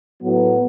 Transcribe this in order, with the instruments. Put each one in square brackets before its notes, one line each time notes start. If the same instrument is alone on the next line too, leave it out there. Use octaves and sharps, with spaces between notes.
[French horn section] A2 F#3 B3